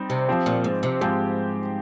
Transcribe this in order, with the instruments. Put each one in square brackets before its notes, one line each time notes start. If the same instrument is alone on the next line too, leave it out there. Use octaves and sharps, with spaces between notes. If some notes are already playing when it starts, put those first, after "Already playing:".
Already playing: [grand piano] G3 C4 D#4
[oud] C3
[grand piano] F3 C4 G4
[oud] A#2
G#2
C3
[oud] G#2 [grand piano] F3 C4 G4